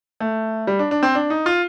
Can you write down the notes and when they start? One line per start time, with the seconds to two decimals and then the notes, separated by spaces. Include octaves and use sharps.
0.20 A3
0.67 G3
0.79 D4
0.91 D4
1.03 C4
1.15 D4
1.30 D#4
1.46 F4